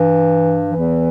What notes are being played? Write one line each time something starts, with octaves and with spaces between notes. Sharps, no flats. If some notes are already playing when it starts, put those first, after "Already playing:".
Already playing: G2 E3
E2 E3